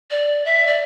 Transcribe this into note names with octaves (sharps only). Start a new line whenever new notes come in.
D5
E5
D5